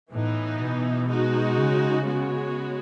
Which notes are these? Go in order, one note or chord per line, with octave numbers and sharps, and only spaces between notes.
A2 E3 B3 D#4
B2
G#3 D#4 F#4
C#3
G#3 B3 F#4 C#5